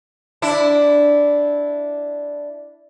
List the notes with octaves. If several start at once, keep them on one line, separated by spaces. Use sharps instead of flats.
D4 E4